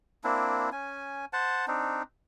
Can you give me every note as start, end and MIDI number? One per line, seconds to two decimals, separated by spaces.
0.24 0.70 58
0.24 0.70 60
0.24 0.70 62
0.24 0.70 64
0.72 1.25 61
0.72 1.25 80
1.33 1.66 72
1.33 1.66 78
1.33 1.66 81
1.68 2.03 60
1.68 2.03 62
1.68 2.03 63